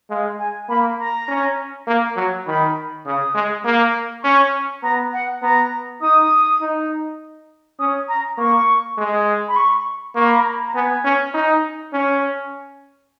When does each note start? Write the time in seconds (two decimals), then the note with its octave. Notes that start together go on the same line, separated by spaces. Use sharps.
0.10 G#3 F5
0.39 G#5
0.69 A#3 B5
0.99 A#5
1.28 C#4
1.87 A#3
2.16 F#3
2.47 D#3 B5
3.06 C#3 D#6
3.35 G#3
3.65 A#3
4.23 C#4 C#6
4.83 B3 A#5
5.13 F#5
5.42 B3 A#5
6.02 D#4 D#6
6.61 D#4
7.79 C#4 D#6
8.08 A#5
8.38 A#3 C#6
8.98 G#3
9.48 B5
9.56 C#6
10.15 A#3 C#6
10.27 B5
10.38 A#5
10.49 B5
10.67 A#5
10.75 B3 G#5
11.05 C#4
11.34 D#4
11.93 C#4